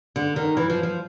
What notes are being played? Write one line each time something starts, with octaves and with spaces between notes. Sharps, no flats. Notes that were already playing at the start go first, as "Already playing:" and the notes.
D3
D#3
E3
F3
F3